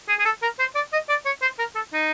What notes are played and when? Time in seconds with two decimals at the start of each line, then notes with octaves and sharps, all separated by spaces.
0.09 G#4
0.19 G#4
0.25 A4
0.42 A#4
0.59 C5
0.75 D5
0.93 D#5
1.09 D5
1.26 C#5
1.42 C5
1.59 A#4
1.75 A4
1.93 D#4